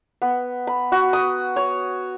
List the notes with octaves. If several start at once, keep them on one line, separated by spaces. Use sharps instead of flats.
B3
B5
F#4
D#6
C#5